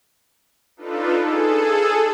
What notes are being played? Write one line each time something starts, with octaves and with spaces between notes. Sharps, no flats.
D4 D#4 F4 A4 B4
G#4 A4